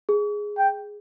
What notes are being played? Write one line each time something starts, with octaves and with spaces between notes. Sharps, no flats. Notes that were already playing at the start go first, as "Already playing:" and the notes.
G#4
G5